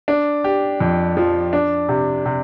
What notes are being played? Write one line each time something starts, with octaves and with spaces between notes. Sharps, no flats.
D4
G4
F2
F3
D4
C3
C3